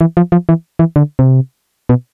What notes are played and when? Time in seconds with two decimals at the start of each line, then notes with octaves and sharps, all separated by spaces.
0.01 E3
0.17 F3
0.32 F3
0.49 E3
0.79 E3
0.96 D3
1.19 C3
1.89 B2